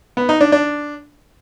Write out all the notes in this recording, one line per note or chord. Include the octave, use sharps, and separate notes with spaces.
B3
D#4
D4
D4